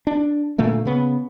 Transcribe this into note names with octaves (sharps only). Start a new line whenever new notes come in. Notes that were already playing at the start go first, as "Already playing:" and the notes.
D4
A#2 D3 A3 A#3
C#3 B3